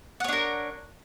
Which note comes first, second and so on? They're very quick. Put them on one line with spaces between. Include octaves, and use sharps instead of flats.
F#5 C#5 D4 A#4